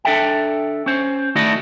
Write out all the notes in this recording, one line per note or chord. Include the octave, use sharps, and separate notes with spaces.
D4 A4 E5 G5
C#4 C5
D#3 A3 D#4 E4 F#4 D5